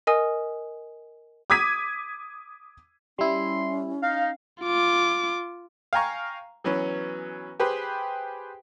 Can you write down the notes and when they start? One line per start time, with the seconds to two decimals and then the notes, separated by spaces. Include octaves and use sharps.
0.07 A#4 D#5 G#5 D#6
1.50 D6 D#6 G#6 B6 D#7
3.19 G3 C#4 E4 C6
4.02 D#4 F5
4.63 F4 D6
5.93 F5 G5 G#5 A#5 C#6
6.64 E3 F#3 B3 C#4
7.60 G4 G#4 B4 C5